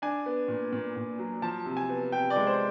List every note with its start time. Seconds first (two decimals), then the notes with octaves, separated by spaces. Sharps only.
0.02 D4 G#5
0.26 B3
0.48 A#2
0.72 A#2
0.96 A#2
1.19 F#3
1.42 F3 A5
1.65 C3
1.77 G#5
1.90 B3
2.12 C3 G5
2.30 D5
2.36 G#3
2.47 C5